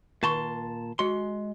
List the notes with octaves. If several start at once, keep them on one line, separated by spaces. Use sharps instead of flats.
A#2 D#3 A5 C6 C#6
G#3 F#4 C6